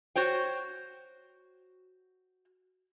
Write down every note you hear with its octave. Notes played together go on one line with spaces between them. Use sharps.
F#4 C5 C#5 G5